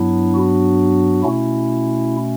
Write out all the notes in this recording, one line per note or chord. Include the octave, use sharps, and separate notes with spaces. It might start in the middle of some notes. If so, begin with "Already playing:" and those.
Already playing: G2 F#3 B3 D4 E4
F#4
B2 A3 C#4 E4